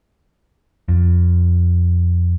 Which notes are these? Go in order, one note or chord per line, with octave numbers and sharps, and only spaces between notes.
F2